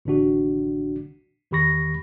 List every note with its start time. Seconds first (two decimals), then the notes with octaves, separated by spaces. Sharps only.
0.05 A1 D3 D4 F#4
1.51 E2 D#3 G4 B5 C#6 A#6